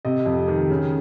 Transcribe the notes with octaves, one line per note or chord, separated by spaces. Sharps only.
C3 D#5
F2
D#3
C#3